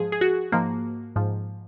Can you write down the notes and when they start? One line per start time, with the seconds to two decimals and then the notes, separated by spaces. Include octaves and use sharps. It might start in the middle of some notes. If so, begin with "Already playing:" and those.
Already playing: G#2 F3 G#4
0.12 G#4
0.21 F#4
0.52 G#2 F3 A#3
1.16 G#2 F3